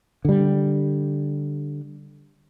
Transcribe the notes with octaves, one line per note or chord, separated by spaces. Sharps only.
D3 G3